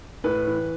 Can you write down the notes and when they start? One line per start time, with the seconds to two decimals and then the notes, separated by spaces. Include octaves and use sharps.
0.24 A2 B4
0.47 E3